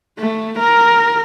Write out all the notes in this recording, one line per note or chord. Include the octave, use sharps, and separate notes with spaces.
A3
A#4